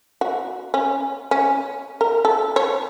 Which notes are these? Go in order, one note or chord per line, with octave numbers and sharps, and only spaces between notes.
F#4
C#4
C#4
A#4
A4
C#5